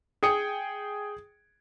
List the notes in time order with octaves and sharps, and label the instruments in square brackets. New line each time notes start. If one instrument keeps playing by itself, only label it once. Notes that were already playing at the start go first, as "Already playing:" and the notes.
[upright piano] G#4 G5 D#6 C#7